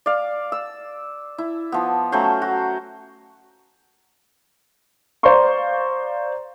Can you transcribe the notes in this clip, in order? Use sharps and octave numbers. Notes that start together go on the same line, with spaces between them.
D5 F5
E6
E4
F3 B3
F#3 A3 C#4 C5
F#4
C5 D5 F5 A#5 C6 C#6